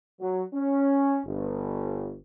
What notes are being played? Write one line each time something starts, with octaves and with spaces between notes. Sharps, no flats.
F#3
C#4
G1